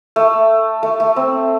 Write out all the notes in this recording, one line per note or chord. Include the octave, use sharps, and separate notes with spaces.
A3
A3
A3
C4